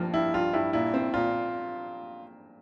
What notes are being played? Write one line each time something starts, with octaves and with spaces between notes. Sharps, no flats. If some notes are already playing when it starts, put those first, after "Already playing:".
Already playing: G2 F3 A#3
G2 E4
G2 F4
G2 E4
A#2 E4
C4
A#2 F4